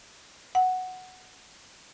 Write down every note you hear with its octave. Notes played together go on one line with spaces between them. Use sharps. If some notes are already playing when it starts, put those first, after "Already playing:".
F#5